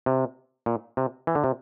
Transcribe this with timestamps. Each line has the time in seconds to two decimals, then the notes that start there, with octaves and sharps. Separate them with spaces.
0.06 C3
0.66 A#2
0.97 C3
1.27 E3
1.35 D3
1.44 C3